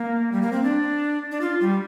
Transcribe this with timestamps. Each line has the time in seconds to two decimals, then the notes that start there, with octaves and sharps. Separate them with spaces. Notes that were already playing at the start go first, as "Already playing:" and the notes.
Already playing: A#3
0.32 G3
0.42 A#3
0.53 C4
0.63 D4
1.31 D4
1.41 F4
1.61 G3